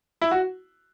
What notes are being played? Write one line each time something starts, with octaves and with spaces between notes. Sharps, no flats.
E4
F#4